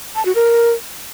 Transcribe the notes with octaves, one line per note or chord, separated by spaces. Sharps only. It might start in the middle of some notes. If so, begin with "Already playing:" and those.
A5
F#4
A#4